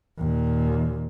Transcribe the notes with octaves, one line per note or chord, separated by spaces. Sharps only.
D#2 A#2